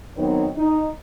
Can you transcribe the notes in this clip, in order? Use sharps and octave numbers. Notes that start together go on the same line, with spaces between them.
D#3 F#3 B3 C4 D#4 C#5
D#4